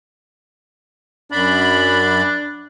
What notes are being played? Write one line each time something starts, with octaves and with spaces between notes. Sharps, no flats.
F#2 D4 B5